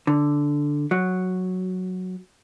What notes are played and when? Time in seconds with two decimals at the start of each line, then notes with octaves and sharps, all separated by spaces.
0.07 D3
0.91 F#3